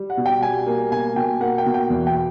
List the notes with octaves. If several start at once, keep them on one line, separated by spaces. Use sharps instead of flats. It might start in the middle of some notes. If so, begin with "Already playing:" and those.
Already playing: G3
F#5
B2
G5
G3 G#5
A#3
B2 G#5
B2 G5
A#3 F#5
G5
B2
G5
E2
G5